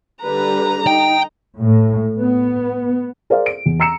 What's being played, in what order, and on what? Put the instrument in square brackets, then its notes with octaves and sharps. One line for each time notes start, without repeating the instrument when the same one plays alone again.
[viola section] D3 G3 B4 [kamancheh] A#5
[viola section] D#4 [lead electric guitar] G5
[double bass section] A2
B3
[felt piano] G#4 A#4 C5 D5 F5
D7
E2
A#5 E6 C#7 E7